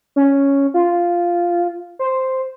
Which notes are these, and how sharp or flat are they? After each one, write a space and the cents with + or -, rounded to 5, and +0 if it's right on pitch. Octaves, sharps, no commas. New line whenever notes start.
C#4 +0
F4 -5
C5 +0